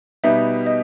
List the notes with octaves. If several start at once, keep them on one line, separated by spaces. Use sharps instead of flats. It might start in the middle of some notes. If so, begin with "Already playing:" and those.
B2 G3 B3 D#4 E5
D#5